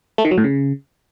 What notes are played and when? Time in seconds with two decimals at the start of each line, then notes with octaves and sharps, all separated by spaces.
0.18 A3
0.25 D#3
0.31 F#3
0.38 A2
0.44 C#3